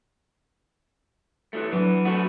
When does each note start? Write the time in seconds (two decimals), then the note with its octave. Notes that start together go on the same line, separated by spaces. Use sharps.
1.53 E3 F3 A3
1.72 E3 F#3 B3 D4
2.05 A3 B3 F#4 A4